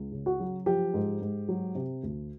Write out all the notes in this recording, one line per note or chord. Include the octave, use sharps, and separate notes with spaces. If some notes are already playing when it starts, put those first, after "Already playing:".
Already playing: C#2
C#3
F#4
F#3
F3 G4
G#2
G#2
F#3
C3
D2